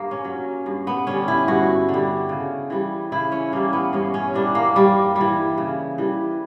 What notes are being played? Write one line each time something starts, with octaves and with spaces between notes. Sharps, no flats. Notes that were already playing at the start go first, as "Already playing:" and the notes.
Already playing: G2 A#3
C#4
F#3
G2
B3
D3 G3 C#4
E4
G2 F#4
D3
G3
C#3
E3 G3
C#3 E4
C#4
E3 G3 A#3
B3
G2 C#4
C#4
E3 G3 D4
A#3
G2 G3
G3
E3
C#3
E3 G3